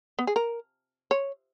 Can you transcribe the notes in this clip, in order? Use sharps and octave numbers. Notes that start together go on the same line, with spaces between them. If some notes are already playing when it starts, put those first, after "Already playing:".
B3
G#4
A#4
C#5